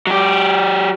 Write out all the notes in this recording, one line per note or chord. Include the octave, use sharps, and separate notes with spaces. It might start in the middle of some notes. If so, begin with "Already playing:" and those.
F#3 G4